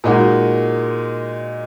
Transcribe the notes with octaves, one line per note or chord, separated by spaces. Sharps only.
A#2 G#3 D#4 F#4